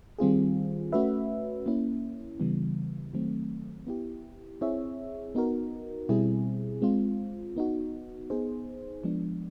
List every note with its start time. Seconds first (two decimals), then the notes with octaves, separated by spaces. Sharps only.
0.19 D#3 G3 C4 F4 G#4
0.92 A3 C#4 F#4 B4 E5
1.66 A#3 C#4 E4
2.40 C#3 E3 G3 B3
3.14 D#3 F#3 A3 C4
3.87 B3 E4 G4
4.61 C4 E4 G#4 C#5 E5
5.35 B3 D#4 F#4 A#4
6.09 B2 G3 C4 E4 G#4
6.82 G#3 C4 F4
7.56 B3 D#4 F#4
8.30 B3 D#4 G#4 C5
9.04 F3 G#3 B3 D4